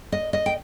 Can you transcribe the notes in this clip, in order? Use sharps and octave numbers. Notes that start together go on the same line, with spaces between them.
D#5
D#5
G5